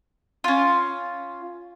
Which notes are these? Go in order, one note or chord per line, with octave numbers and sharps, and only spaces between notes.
C#4 F4